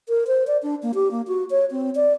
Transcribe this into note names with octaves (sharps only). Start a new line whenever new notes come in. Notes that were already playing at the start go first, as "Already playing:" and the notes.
A#4
C5
D5
D4
A#3
G4
A#3
F#4
C#5
C4
D5